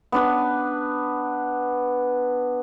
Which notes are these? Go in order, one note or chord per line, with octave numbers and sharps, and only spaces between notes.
B3 D4 B4